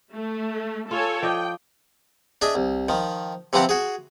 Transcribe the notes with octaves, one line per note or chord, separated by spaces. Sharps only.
A3
F4 A4 C#5 G#5
F3 D5 D#5 G5
D4 G#4 D#5 E5
C2
D#3 F3
C3 E3 F3 C4 G4 F#5
F#4 G#4